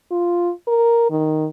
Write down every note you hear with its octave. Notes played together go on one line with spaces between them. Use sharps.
F4
A#4
D#3